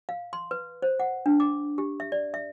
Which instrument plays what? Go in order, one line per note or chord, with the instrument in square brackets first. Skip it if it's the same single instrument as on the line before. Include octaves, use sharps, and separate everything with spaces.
[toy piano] F5
C6
B4
C5
F#5
D4
D6
G4
E5
D5
E5